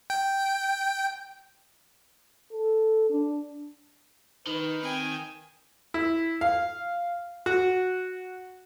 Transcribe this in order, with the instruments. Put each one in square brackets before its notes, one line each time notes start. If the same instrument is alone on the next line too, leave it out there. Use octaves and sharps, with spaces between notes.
[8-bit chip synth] G5
[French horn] A4
D4
[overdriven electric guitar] D#3 [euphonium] D#4 [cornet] B4
[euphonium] C4 [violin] G5 G#5
[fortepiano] E4
F5
F#4